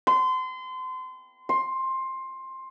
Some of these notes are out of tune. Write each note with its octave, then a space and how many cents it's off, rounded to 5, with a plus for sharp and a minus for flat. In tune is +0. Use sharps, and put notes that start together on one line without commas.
C6 -30
C6 +15